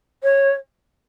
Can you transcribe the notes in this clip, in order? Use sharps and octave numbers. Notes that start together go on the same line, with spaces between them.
C#5